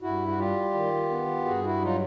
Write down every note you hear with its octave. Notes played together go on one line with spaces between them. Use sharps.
G2 E4 F#4
F#4
G3 F4 G4
D#3
B3
G2 F#4 G#4
E4 F#4
F#3 D#4 F4